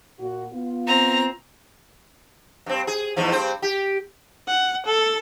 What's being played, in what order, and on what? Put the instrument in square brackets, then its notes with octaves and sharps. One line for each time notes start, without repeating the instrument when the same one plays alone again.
[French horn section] A#2 F#4
B3 F4
[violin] C4 A#5
[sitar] G2 C4
G#4
E2 G#2 F3
G2 C4 C5
G4
[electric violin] F#5
A4